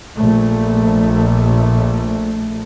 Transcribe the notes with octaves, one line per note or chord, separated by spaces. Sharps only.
A#1 A3